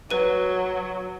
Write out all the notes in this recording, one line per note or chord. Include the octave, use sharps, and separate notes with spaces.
F#3 B4 D#7